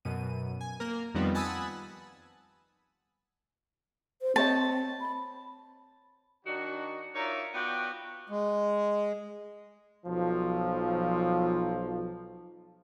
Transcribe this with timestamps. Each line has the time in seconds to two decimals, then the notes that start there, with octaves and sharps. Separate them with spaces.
0.05 F#2 B2 D#7
0.61 G#5
0.80 A#3 A#4
1.14 F2 D#3 F3 G3 B3 C4
1.35 F#5 G#5 A5 B5 D#6 E6
4.22 C5
4.36 C4 C5 C#5 D#5 A5
5.01 B5
6.46 D#3 D4 D#4 F#4
7.15 D#4 F4 A#4 C#5 D5 E5
7.54 B3 F4 F#4 D5 G5
8.30 G#3
10.06 B1 F3